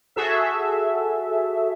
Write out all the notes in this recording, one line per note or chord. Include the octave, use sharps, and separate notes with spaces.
F#4 G#4 A4 E5